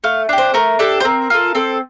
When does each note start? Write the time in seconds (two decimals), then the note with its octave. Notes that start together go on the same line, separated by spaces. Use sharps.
0.04 A3 F5
0.29 D4 G4
0.38 C5
0.54 A3 A#4
0.79 D4 G4 A4
1.00 C5
1.04 C4 A#4
1.30 F4 A4
1.55 C4 A4